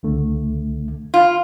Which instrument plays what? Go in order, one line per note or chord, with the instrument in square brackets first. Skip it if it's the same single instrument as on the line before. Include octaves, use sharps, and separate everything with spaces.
[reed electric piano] C#2 D3 A3
[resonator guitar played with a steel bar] F4